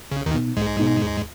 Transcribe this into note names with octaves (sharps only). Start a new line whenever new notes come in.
B1 C#3
D#2 D#3
B2 B3 D#4
B1 G#2 G#3
B2 B3 D#4
D#2